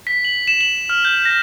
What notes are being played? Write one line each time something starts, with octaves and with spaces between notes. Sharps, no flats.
B6
F#7
E7
F#7
F6
G6
A#6